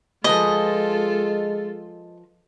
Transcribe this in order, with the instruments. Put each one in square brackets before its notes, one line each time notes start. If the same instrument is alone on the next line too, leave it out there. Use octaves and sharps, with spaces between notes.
[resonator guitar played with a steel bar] F3 B4 G#5 [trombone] G#3 [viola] F4 A4 [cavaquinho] D#5